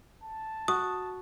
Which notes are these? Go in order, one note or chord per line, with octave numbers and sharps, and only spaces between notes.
A5
F#4 D#6